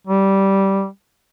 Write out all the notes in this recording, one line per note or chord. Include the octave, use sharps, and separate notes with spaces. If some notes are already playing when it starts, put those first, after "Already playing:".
G3